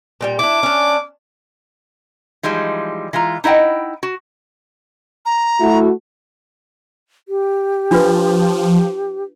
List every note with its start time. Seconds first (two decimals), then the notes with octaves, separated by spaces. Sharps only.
0.21 A#2 G3 G5
0.39 D4 E4 D6
0.63 C#4 D4
2.43 E3 F3 G3 G#3 D#4
3.13 E3 G#3 F4 A#5
3.44 D#4 E4 D#5 F#5 G5
4.03 F#4
5.26 A#5
5.60 A3 E4 F#4
7.28 G4
7.91 F3 D4 F4 B4